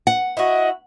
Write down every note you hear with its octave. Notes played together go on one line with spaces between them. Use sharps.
F#5
E4 F#4 D#5